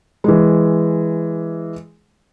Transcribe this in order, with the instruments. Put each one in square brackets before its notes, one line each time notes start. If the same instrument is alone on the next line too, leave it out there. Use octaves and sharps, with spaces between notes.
[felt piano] E3 G#3